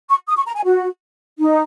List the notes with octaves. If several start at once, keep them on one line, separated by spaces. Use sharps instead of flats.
C#6
D#6
C#6
A#5
G#5
F#4
D#4